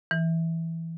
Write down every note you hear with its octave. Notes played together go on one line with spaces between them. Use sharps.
E3